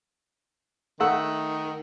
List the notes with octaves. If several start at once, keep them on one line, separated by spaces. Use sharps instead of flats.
D#3 A3 F#5 E6